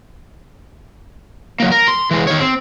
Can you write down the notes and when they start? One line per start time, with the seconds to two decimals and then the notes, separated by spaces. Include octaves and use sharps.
1.60 F#3 A#3
1.72 A#4
1.88 C6
2.11 E3 G#3
2.27 D#3 C#5
2.40 C4